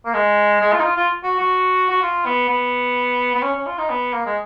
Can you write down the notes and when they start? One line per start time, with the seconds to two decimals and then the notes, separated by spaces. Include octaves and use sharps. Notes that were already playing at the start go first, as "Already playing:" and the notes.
0.05 A#3
0.14 G#3
0.61 G#3
0.73 F4
0.79 D#4
0.84 F4
0.96 F4
1.24 F#4
1.39 F#4
1.90 F#4
2.02 F4
2.25 B3
2.49 B3
3.35 B3
3.43 C#4
3.54 C#4
3.66 F4
3.78 D#4
3.90 B3
4.13 A#3
4.26 G#3